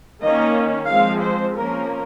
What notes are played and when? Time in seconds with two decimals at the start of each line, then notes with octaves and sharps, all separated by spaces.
0.23 D#3 A#3 C#4 D#5
0.89 F3 G#3 C4 F5
1.22 C5
1.56 F3 A#3 C#4 A#4